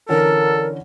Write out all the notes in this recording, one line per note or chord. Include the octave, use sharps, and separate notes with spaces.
D3 E3 C#4 A4 A#4